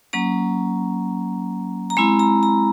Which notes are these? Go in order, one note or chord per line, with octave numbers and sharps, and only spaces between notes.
F#3 A#3 C#4 A#5
A#5
G#3 C4 E4 B5
A#5
A#5